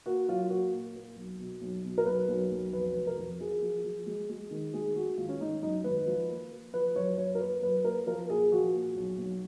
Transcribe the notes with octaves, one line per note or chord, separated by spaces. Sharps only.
A#3 F#4
F#3 F4
A#3 F#4
A#2
A#3
B1
B2
B1
B2
A#4
B1 B4
B1
B1
F2 B4
F1
A#4
F2
F3 G#4
F3
F3
G#3
G#3
D#3
G#3 G#4
G#3 F#4
G#1 F4
C#4
G#1 D#4
F#2 D#4
G#1 B4
F3
A#3
A#3
F3 B4
F#2 C#5
F#2 C#5
A#4
A#3 B4
F#2 B4
A#3 A#4
F3 A#4
A#2 G#4
F3 F#4
A#2
B1
B1